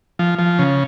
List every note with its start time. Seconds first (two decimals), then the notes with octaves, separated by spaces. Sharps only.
0.19 F3
0.39 F3
0.59 C#3